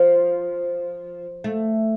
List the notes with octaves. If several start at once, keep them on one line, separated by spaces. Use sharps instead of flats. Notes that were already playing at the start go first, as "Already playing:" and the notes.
Already playing: F3
A3